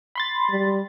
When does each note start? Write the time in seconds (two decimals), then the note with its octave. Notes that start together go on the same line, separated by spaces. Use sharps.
0.15 B5 C6 A6
0.50 G3